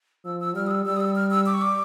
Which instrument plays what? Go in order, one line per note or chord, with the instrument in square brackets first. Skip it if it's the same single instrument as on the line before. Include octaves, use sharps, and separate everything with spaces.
[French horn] F3 [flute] E6
[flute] E6
[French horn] G3 [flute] F6
[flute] D#6
E6
[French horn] G3 [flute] E6
[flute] D#6
E6
F6
E6
D6
C#6
D6